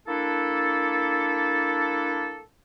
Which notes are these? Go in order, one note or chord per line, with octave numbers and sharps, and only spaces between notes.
A#3 D4 E4 A4